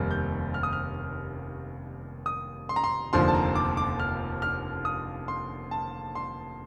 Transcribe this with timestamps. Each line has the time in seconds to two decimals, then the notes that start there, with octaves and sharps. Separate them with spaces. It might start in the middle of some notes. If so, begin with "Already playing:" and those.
Already playing: F1 D#2 D#3 G3 F6
0.11 G6
0.54 F6
0.63 D#6
0.73 F6
2.26 D#6
2.69 C6
2.76 A#5
2.84 C6
3.13 F1 D#2 D3 F3 C6
3.28 A5
3.34 A#5
3.55 D6
3.77 D6
4.00 F6
4.42 F6
4.85 D#6
5.28 C6
5.71 A5
6.15 C6